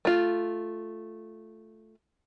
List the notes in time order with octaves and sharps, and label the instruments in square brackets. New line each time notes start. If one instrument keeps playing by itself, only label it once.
[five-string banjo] A3 F4